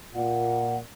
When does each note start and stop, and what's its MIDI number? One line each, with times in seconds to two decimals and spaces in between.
0.15 0.77 46
0.15 0.77 78